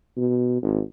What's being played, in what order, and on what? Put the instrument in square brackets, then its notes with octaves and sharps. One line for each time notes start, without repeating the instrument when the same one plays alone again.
[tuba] B2
G#1